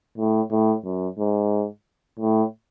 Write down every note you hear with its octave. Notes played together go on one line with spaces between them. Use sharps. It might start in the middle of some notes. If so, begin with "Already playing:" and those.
A2
A2
F#2
G#2
A2